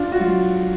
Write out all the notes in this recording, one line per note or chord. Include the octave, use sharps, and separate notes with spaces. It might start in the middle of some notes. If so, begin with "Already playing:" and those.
Already playing: D4 F4
F#4
F#3 F4